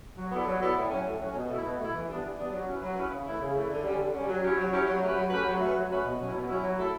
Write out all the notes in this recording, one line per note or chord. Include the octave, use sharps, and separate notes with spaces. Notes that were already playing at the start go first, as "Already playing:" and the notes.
F#3
B3 E4 A4 D5
F#3
B3 E4 A4 D5
A2
F#3 C#4
A2
F#3 C#4
B2
A3
E4
B2
A3 E4
E3
G3 B3 D4
E3
G3 B3 D4
F#3
C#4 E4 B4
F#3
C#4 E4 B4
C#3
E3 A3 E4
C#3
E3 A3 E4
D3
G3 C#4
D3
G3 C#4
F#3
C#4 E4 G4 C#5
F#3
C#4 E4 G4 C#5
F#3
A3 C#4 G4 B4
F#3
A3 C#4 G4 B4
F#3
A3 C#4 F#4 B4
F#3
A3 C#4 F#4 B4
B2
F#3 C#4 E4
B2
F#3 C#4 E4
F#3
A3 E4 A4